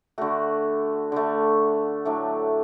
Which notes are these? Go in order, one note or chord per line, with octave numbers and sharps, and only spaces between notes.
D3 A3 F#4
D3 A3
A2 F#3 A3 D4